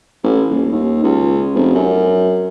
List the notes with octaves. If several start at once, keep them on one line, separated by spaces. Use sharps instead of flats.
A1
D#1
D#2
C#2
F1
F#2